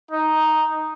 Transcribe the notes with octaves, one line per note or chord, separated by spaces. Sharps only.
D#4